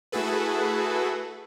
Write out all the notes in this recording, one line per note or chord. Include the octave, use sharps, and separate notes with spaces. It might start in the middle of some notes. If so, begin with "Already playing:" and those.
A3 E4 F#4 G#4 A4 B4